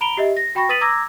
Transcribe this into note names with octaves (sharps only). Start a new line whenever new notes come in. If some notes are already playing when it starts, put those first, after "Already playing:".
A#5 B5 D7 F7 G7
G4 D#5 E5
A#6
F#4 G5 B5 C#6 A#6
B4 D#6 A6 B6 D#7 F#7
A#5 D6 E6 G#6 A#6